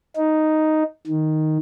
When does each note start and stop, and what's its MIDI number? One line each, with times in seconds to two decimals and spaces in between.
0.16 0.83 63
1.07 1.58 51